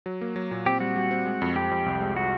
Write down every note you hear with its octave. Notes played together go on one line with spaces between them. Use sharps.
F#3
A#3
F#3
A#2
C4 G4
G3 F#4
G3
C4
G#3
F2
F2 G4
F2
C2
G#3
G#3 F#4